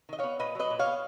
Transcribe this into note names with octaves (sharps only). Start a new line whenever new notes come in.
D#3 D#5
B3 C#5 F5
A#2 B4 D#5
F#3 B4 D#5
A#2
C#5 F5
B3